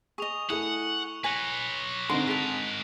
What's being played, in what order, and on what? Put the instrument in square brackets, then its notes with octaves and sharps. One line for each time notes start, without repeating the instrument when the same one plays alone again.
[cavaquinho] G#4 D#5 [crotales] C#6 F7 G7
[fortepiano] A3 E4 [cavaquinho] G#4 [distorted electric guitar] F#5
[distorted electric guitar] B4 C#5 [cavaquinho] G#5 [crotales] F#6 A#6 F#7
[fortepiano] D3 C4 D#4 [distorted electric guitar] G#3 A#4 [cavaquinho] C6
[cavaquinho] G#4 A5 [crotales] B6 F7